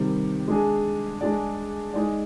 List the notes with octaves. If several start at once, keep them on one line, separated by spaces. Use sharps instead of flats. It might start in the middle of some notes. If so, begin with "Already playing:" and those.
Already playing: C3 D#3 G3
G#3 D4 G#4
G#3 D4 G#4 D5
G#3 D#4 G#4 D5